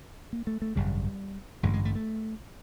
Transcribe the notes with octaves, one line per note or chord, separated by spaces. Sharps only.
A#3
A3
A3
G#1 F#2 C#3 G3
A1 G2 D3 G#3
G#3
A3
A3